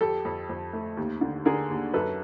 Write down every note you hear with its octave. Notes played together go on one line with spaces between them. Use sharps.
F2 G4 A4
F2
F2
A3
D#2
D3
D3 G#4 A#4
D#2
F#2 A4 B4